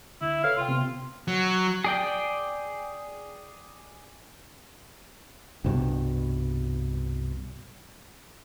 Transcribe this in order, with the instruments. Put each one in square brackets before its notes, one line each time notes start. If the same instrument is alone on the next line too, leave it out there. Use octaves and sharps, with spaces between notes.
[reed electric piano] C#2 D3 [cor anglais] E4
[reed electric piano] A4 B4 C#5 [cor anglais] F5
[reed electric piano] C3 G5 [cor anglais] F4
[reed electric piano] C3 B3
[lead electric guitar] F#3
[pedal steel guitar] G#4 D5 G5
[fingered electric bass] C2 G2 B2